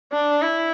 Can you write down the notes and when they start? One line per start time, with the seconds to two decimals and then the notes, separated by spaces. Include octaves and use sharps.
0.12 D4
0.42 E4